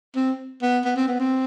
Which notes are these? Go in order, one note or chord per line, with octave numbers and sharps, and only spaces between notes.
C4
B3
B3
C4
B3
C4